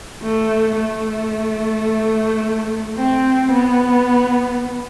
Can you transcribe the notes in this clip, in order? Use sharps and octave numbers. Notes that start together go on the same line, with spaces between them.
A3
A3
C4
B3